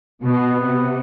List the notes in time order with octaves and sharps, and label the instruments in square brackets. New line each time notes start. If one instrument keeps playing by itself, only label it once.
[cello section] B2 [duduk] B3
[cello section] C3